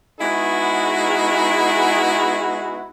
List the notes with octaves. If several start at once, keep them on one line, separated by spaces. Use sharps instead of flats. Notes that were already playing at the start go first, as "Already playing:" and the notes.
G#3 B3 D#4 E4 F#4 G#4